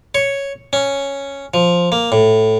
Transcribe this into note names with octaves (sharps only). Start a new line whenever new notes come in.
C#5
C#4
F3
A#3
A2